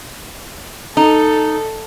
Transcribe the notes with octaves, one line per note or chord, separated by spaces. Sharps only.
D#4 A4